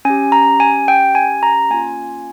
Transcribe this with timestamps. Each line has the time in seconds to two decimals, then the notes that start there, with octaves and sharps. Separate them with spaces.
0.05 C#4 G4 G#5
0.32 A#5
0.60 G#5
0.88 G5
1.15 G#5
1.43 A#5
1.70 A#3 C#4 F4 G#5